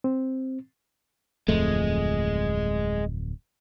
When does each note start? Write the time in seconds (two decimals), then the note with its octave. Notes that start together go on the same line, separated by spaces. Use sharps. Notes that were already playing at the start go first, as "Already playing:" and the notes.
0.04 C4
1.48 D1 F2 G#3 A3